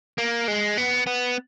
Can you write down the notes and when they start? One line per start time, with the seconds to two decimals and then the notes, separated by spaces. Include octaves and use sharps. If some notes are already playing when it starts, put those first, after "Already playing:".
0.18 A#3
0.48 G#3
0.78 B3
1.07 B3